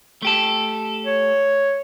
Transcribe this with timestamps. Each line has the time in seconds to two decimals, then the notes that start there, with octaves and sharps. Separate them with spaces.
0.22 A3 G4 A4
1.05 C#5